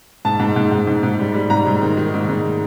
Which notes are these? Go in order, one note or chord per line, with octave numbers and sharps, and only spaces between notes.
G#2 A5
G#2
G#2
G#2
G#2
G#2
G3
G3
G#2 A#5
G#2
D#3
D#3
G#2
G#2